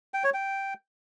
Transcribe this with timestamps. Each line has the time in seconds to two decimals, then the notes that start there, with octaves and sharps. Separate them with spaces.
0.14 G5
0.24 C#5
0.34 G5